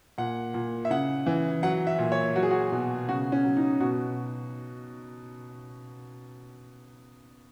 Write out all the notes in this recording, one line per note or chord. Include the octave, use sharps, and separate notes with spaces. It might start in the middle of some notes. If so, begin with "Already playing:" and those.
A#2 F#5
A#2
E5
C#3 F#5
E3
F#3 F#5
E5
A#2
C#5
F#3 F#4
G#4
F#4
B2
C#3 F#4
C#4
F#3
D#4
B2 F#4